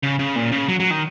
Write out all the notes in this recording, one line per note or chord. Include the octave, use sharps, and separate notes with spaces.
C#3
C#3
A#2
C#3
F#3
F#3
D#3